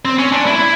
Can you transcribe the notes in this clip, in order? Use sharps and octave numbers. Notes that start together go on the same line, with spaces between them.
C4
C#4
D4
E4